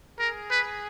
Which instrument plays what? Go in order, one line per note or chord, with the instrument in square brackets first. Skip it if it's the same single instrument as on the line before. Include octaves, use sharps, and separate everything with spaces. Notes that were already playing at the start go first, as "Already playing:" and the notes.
[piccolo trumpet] G#4 [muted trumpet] A#4
[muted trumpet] B4